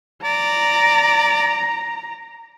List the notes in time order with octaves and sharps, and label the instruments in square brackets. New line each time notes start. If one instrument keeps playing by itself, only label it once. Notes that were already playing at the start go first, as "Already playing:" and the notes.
[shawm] D5 [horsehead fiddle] A#5